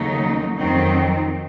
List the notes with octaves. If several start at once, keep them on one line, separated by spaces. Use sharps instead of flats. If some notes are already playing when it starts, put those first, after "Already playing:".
Already playing: D#2 C#3 F#3 A3 D#4
F2 D#3 F#3 C4 D#4